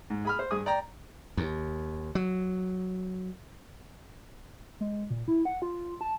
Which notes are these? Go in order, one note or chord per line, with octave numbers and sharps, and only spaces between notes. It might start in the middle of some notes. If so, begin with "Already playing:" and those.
G#2
G#4 B5 F6
C5
G2 G#4 D#6
D5 G5 A#5
D#2
F#3
G#3
A#2
E4
F#5
F4
A5